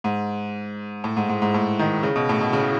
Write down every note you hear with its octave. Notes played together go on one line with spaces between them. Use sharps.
G#2
A2
G#2
G#2
G#2
A2
D#3
C#3
B2
A2
B2
C#3